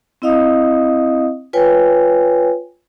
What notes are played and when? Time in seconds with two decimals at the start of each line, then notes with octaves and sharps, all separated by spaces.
0.22 C4 E4 D#5 F5 D#6
1.53 F4 B4 C#5 G5 G#5